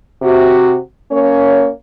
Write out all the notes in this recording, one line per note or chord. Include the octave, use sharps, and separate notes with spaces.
C3 F#4
A#3 C#4 C#5